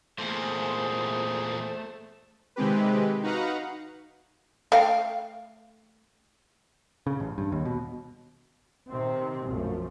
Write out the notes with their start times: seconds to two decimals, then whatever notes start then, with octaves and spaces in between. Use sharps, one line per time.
0.18 E2 A#2 A3 G#4 C5
2.56 C3 D#3 G#3 C4 G4 B4
3.23 D#4 F#4 B4 F5 F#5 A#5
4.72 A3 F5 G5
7.07 C#3
7.20 A1
7.38 G2
7.52 D#2
7.65 B2
8.90 C3 D#3 C4
9.47 B1 F#2 F3 A3